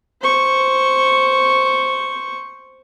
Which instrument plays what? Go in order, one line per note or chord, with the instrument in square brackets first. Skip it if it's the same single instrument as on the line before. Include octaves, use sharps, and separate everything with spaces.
[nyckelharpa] C5 C#6